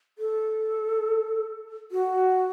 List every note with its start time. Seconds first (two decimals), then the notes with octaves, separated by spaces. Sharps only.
0.18 A4
1.92 F#4